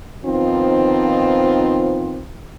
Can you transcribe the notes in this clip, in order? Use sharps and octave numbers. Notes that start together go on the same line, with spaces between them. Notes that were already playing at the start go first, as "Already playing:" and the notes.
D#3 F3 B3 C4 D#4 F4